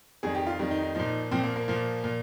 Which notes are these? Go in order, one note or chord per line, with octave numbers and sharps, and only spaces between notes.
F2 D#3 G3 G#4
G4
F4
F2 D#3 G3
D#4
D#4
A#2 F3 D#4
A#2 F3 C4
A#3
A#3
A#2 F3
A#2